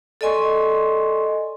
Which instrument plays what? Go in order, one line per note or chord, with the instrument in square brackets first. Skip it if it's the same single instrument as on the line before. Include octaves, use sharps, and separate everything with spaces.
[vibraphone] A4 D5 D#5 G#5 C6 C#6